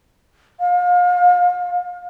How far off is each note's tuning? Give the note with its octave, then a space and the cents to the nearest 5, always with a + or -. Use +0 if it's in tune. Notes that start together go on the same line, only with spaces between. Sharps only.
F5 +35